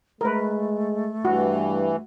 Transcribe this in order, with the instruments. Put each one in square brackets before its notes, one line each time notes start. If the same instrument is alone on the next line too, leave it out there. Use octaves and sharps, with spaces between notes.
[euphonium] G#3 [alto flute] A3 [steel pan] A#4 B4
[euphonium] G2 [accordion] E3 [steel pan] F#4